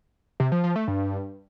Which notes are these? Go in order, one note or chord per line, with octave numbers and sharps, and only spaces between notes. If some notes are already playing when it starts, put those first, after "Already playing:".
C3
F3
F3
A3
G2